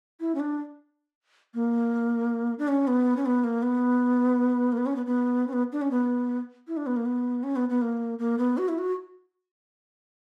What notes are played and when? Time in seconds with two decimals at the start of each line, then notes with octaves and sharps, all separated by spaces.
0.20 E4
0.35 C#4
0.40 D4
1.54 A#3
2.59 D4
2.68 C#4
2.87 B3
3.17 C#4
3.26 B3
3.44 A#3
3.63 B3
4.72 A#3
4.78 B3
4.86 C#4
4.96 B3
5.06 B3
5.47 C#4
5.53 B3
5.72 D4
5.82 C#4
5.91 B3
6.68 E4
6.77 D4
6.87 B3
6.96 A#3
7.05 B3
7.43 C#4
7.56 B3
7.69 B3
7.82 A#3
8.19 A#3
8.38 B3
8.58 F#4
8.68 E4
8.78 F#4